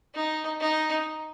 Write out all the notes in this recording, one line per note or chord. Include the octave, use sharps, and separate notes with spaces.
D#4
D#4